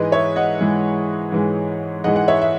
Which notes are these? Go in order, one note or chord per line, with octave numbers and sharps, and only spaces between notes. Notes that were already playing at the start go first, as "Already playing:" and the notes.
Already playing: G#2 E3 G#3 B4 D#5
C#5 E5
D#5 F#5
G#2 E3 G#3
G#2 E3 G#3
G#2 E3 G#3 D#5 F#5
F#5
C#5 E5
E5